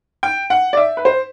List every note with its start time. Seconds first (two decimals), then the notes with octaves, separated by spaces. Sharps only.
0.23 G5
0.50 F#5
0.73 D5
0.77 E5
0.97 B4
1.05 C5